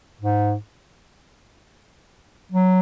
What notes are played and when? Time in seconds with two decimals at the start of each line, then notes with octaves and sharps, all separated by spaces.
0.21 G#2
2.52 F#3